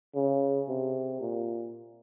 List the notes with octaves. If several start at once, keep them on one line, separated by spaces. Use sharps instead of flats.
C#3
C3
A#2